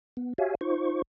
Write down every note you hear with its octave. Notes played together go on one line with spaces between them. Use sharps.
B3
F#4 G4 C#5 E5 F5 G#5
D#4 F4 C5 C#6